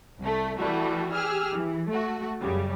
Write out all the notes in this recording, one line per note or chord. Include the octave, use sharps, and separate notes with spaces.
C2 A3
E3 G3 A3 E4 F#4
G4 G#4 E6 F6
E3
A3 F#4
F#2 C#3 G3